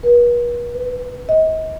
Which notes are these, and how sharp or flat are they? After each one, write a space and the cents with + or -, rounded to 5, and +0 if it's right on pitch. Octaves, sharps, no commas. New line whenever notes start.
B4 -45
B4 +10
D#5 +35